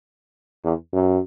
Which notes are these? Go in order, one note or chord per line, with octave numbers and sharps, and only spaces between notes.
E2
F#2